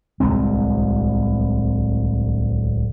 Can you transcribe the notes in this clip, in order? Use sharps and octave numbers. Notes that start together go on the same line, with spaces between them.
D1 C2 G#3 C4